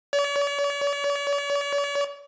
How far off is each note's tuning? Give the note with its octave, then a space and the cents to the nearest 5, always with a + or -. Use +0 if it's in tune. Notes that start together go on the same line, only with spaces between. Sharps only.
C#5 +45